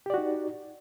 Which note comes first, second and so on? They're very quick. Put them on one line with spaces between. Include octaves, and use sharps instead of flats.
G4 D5 F#4 D#4